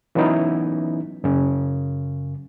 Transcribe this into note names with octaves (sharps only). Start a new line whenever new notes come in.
E3 F#3 B3 C#4 D#4 E4
F#2 C#3